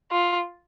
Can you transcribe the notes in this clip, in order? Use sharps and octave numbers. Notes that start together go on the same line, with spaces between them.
F4